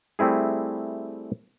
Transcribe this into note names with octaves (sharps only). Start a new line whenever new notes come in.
G3 A3 C4 E4 G#4